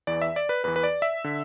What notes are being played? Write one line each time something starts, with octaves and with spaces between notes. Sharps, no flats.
E2 E3 D5
E5
D5
B4
E2 E3 B4
B4
D5
E5
D3